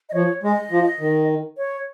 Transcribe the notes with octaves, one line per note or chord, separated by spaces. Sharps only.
D#5
F3 C#5
G#3 D#5
F3
D#3
C#5